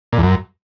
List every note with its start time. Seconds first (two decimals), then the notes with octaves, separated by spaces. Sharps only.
0.13 A#2
0.18 E2
0.23 F#2